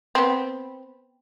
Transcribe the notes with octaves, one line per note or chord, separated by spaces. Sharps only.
B3 C4